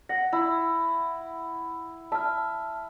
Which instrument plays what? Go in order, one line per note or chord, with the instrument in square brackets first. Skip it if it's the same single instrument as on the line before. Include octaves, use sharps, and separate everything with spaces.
[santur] F#5 [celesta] A#6
[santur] E4
[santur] E5 [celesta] A5 F6